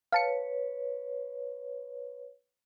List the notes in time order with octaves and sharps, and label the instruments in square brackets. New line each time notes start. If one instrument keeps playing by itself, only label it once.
[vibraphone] B4 C#5 [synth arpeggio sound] F5 A5 C#7